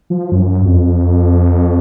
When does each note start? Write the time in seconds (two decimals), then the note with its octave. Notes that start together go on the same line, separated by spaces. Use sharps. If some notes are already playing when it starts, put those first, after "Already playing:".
0.10 F3
0.32 F#2
0.65 F2